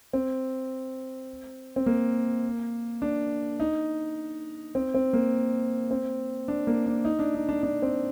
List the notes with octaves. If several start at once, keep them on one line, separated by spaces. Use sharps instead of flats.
C4
C4
A#3
D4
D#4
C4
C4
A#3
C4
D4
A#3
D4
D#4
D4
D#4
D4
D4
C4